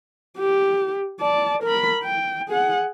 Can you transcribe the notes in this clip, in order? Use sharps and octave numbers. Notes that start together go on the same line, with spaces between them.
G4
D5 A5
A#4 B5
G5
G#4 F#5